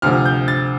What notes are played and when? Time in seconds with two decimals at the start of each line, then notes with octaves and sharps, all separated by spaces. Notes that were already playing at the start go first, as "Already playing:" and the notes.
0.02 D2 C3 F3 F6
0.26 G6
0.48 A6